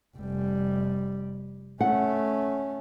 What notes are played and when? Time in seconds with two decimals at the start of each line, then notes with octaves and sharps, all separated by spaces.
0.17 F1 G3
1.81 A3 C#4 F#5